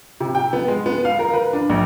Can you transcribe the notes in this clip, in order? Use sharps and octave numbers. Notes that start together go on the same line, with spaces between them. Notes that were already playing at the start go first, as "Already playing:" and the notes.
C3
G5
B3
G#3
B3
F5
A#4
B4
D4
A#1